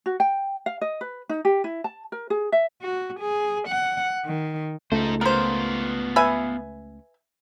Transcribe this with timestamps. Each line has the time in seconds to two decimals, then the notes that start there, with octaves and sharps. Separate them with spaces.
0.06 F#4
0.20 G5
0.66 F5
0.81 D#5
1.01 B4
1.29 D#4
1.45 G4
1.64 E4
1.84 A5
2.12 A#4
2.30 G#4
2.52 E5
2.82 F#4
3.20 G#4
3.68 F#5
4.25 D#3
4.92 C#2 A3 D#4 C5
5.21 B3 F4 A#4 C5
6.16 B4 E5 G#5